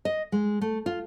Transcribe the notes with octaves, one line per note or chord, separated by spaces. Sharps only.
D#5
G#3
A3
F4